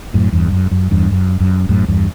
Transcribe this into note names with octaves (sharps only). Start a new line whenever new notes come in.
F#2 A2
E2 G2
F#2
F#2
E2 G2
F#2
F#2
F#2 A2
E2 G2